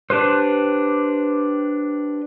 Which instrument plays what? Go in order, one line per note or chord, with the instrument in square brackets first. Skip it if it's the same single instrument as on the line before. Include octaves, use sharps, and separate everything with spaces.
[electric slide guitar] D4 G4 B4 C5